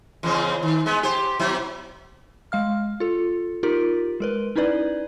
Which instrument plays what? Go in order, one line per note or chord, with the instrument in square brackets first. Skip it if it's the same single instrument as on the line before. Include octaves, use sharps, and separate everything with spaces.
[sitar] E2 C#3 C4
D#3
G#3 B3
G4 C5
B2 F#3 E4
[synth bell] G#3 F5 F6
F4 A4
D#4 F4 G4 A#4
G#3 A#4 B4
C#4 D#4 E4 B4 D5